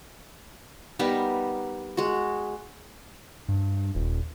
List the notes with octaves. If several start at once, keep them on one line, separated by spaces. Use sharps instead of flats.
G3 B3 D#4 A#4
G#3 F#4
G2
D#1